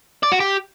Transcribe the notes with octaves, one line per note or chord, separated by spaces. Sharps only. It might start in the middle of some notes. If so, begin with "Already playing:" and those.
D5
F#4
G4